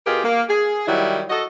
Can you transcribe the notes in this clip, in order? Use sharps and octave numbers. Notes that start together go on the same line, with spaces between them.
B2 F4 G4 G#4 A#4
A#3
G#4
D#3 F#3 G3 E4
F#4 A4 D#5